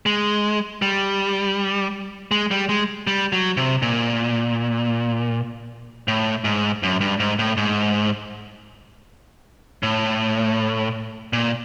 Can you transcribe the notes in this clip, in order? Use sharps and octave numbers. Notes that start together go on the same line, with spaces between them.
G#3
G3
G#3
G3
G#3
G3
F#3
C3
A#2
A2
G#2
F#2
G2
G#2
A2
G#2
A2
A#2